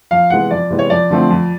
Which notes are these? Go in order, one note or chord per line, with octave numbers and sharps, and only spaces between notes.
F2 F5
C3 E3 G#3 B3 F#5
F2 D5
C3 E3 G#3 B3
C#5
F2 D5
D3 F3 A3 C4
F2